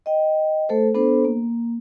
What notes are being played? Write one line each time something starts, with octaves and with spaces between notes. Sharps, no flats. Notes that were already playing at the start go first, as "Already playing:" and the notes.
D#5 G5
A3 A4 C5
B3 D4 A4 C5
A#3